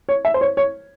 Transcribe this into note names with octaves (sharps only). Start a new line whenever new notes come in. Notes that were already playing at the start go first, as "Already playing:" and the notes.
C#5
E5
C5
C#5
C#5